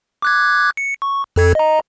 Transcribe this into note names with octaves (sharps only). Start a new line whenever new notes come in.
D6 F#6 G#6
C#7
C#6
F2 A4 G#6
D#5 A#5